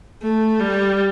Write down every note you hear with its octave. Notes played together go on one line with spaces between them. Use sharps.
A3
G3